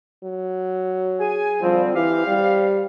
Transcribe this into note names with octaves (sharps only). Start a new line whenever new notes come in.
F#3
G#4 G#5
D3 F3 G3 C4
E3 C4 G4 F5
G3